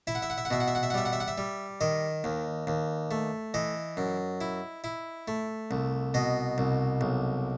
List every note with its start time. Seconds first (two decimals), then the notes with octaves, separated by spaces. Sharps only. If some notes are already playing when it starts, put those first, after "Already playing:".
0.07 E4 E5
0.15 F#5
0.22 E5
0.30 F#5
0.38 E5
0.45 F#5
0.51 B2 E5
0.60 F#5
0.68 E5
0.75 F#5
0.83 E5
0.90 F#5
0.94 G3 E5
1.05 F#5
1.13 E5
1.20 F#5
1.28 E5
1.38 G3
1.81 D#3 D#5
2.24 D#2
2.67 D#2
3.11 A3
3.54 E3 D#5
3.97 F#2
4.41 E4
4.84 E4
5.28 A3
5.71 C2
6.14 B2 D#5
6.58 C2
7.01 B1